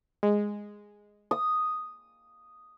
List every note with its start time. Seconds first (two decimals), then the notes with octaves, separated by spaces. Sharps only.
0.23 G#3
1.31 D#6